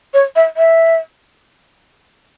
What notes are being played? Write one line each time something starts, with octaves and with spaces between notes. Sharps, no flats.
C#5
E5
E5